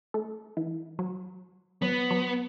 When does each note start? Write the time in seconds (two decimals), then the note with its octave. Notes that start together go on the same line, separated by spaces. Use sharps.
0.14 A3
0.57 E3
0.99 F#3
1.82 F#3 B3
2.11 F#3